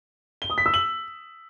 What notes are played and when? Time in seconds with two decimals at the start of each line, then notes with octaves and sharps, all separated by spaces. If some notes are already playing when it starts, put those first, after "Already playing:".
0.42 G7
0.50 D#6
0.58 B6
0.66 E6
0.74 F#7